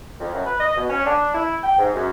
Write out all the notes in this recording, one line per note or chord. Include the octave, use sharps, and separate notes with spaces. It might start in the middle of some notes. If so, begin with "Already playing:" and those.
F2
F#2
B4
D#5
B2
C#4
D4
E4
G5
G#2
F#2